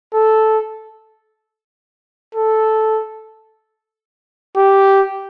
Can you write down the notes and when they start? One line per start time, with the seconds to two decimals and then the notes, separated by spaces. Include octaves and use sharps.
0.14 A4
2.35 A4
4.57 G4